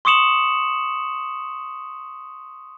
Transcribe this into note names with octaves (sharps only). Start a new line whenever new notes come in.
C6 C#6 D#6 C#7 E7 F#7